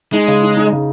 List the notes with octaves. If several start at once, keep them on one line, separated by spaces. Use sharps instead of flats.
G#3 D#4
C#3
D#4
D#4
C#3